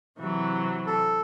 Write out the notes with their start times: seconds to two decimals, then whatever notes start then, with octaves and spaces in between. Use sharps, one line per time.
0.19 C3 E3 F#3
0.87 A4